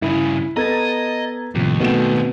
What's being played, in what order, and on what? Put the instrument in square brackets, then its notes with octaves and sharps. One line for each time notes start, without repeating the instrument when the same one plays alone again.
[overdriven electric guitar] G2 C#3 [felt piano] E4
[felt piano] B3 A4 [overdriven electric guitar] D#5 [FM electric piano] A#5 G#6 A6
[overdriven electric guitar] D#2 [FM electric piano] A2 C3 F3
[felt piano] B2 A3 E7 [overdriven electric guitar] D#3 C4 [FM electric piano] B3